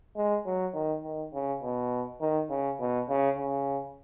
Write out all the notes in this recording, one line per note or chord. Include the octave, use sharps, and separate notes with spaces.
G#3
F#3
D#3
D#3
C#3
B2
D#3
C#3
B2
C#3
C#3